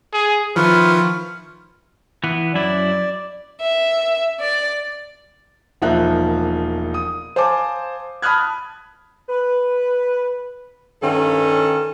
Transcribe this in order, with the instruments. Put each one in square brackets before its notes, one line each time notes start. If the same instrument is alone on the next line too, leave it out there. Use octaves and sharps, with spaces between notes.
[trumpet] G#4
[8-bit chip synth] D#3 F3 [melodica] E4 F4 C#6 [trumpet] B4 [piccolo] F6
[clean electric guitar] E3 B3
[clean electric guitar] F#2 F#3 E4 [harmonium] D5
[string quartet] E5
D5
[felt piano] E1 F3 A#3 D#4 E5 F#6
D#6
C5 F5 G#5 A5 D6
A5 B5 D#6 F6 F#6 G#6
[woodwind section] B4
[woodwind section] G2 [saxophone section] D#3 C#4 A4